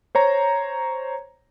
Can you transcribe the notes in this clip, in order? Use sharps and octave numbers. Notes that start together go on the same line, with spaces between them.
C5 C#5 A#5